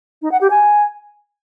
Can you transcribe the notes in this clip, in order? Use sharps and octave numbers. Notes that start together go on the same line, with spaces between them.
D#4
F#5
G4
G#5